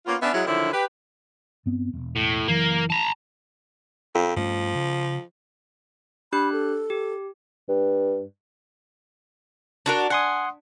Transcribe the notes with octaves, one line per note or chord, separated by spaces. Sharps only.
A#3 B3 C#4 F4
B3 C#4 D4 E5
F#3 G#3 E4
D3 D#3 F3 F#3 D4 E4
G4 B4
G2 B3 C4
E1
A2
F#1 E3 F#3 A#3
A5 A#5
F2
G2 F3 A3 C#4
C#3
D4 G4 B5 F#6
A4
G4
G2
D4 F#4 A#4
F#5 G#5 C6 D#6